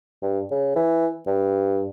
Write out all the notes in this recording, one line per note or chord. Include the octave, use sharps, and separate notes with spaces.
G2
C#3
E3
G2